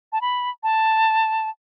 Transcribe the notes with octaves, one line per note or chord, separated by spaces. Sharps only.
A5
B5
A5